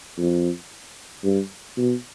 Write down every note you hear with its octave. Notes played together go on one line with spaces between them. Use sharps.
F2
G2
B2